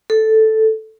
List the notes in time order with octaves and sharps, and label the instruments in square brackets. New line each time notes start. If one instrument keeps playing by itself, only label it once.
[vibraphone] A4